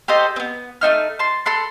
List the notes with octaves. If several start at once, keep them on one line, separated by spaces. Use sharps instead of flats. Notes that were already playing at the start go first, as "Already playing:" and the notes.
G4 A4 C5 D#5
B3 C4
A3 C4 D#4 F6
A5 C6
A4 B5 C6 F#6